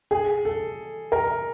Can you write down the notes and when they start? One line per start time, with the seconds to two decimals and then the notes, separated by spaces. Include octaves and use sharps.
0.11 G#4
0.45 A4
1.12 A#4